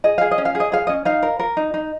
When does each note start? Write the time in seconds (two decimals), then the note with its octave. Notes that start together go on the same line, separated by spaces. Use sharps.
0.04 G#4 D#5
0.18 G#4 F5
0.31 D#5
0.38 C#4
0.45 F5
0.55 G#4
0.60 D#5
0.72 G#4 F5
0.87 C#4 D#5
1.05 D#4 F5
1.23 A#4
1.39 A#4
1.57 D#4
1.74 D#4